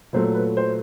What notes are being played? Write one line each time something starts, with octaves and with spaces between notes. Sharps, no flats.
A#2 F#3 A3 C5
B4
C5